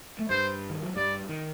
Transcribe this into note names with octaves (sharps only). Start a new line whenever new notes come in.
A3
G2 G3 C5
D#3
F#3
G2 G3 D5
D#3